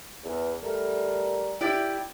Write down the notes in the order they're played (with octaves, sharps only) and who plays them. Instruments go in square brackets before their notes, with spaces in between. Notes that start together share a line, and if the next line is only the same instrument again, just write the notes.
[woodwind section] E2
G3 A3 A#4
[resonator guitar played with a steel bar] E4 G4 D5